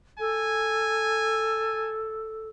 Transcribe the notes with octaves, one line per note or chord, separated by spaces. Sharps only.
A4 G#5